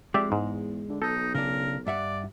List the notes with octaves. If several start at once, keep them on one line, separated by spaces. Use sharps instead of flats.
F2 G#3 G4 D5 E5
E2 G#2
D3
B1 D#4 A4
C#3 D4 A#4
G2 D5 E5 F#5